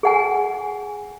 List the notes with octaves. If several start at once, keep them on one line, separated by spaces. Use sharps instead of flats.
G#4 F#5 G#5